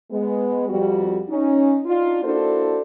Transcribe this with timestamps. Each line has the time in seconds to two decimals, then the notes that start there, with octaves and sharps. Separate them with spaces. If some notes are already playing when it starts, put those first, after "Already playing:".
0.11 G#3 B3
0.68 F2 G3 F#4
1.29 C#4 D#4
1.85 D4 D#4 F4
2.23 A#3 D4 E4 F#4 A4 C5